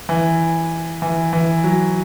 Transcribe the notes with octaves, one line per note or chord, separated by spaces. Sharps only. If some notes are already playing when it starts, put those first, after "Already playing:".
E3
E3
E3
F#3